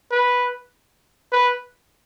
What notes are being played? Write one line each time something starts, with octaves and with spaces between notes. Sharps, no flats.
B4
B4